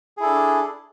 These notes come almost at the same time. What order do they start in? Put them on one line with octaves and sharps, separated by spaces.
G#4 E4 A4 D4